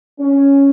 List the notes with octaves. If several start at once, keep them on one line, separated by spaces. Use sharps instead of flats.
C#4